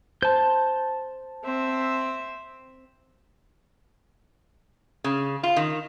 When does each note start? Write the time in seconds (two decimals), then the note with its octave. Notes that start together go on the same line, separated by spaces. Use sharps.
0.23 C5 A5 G6
1.44 C4 E5
5.04 C#3
5.43 F4
5.56 D#3